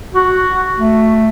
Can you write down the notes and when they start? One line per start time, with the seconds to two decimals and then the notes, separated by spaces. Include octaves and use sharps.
0.15 F#4
0.78 A3